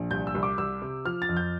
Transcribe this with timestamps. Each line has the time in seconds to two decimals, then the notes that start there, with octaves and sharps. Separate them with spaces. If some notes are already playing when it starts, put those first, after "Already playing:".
Already playing: A#1
0.11 C2 G6
0.27 E6
0.35 C2
0.43 D6
0.58 C2 E6
0.82 C3
1.05 F3 F6
1.22 A6
1.29 F2
1.37 G6